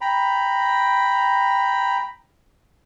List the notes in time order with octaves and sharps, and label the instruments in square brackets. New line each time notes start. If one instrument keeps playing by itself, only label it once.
[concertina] G5 A#5 B5